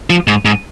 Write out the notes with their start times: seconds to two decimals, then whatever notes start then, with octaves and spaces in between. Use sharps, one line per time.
0.10 F3
0.28 G#2
0.45 G#2